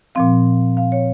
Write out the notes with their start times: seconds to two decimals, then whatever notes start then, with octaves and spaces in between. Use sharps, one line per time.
0.15 A#2 F3 C4 F5
0.77 F5
0.92 C#5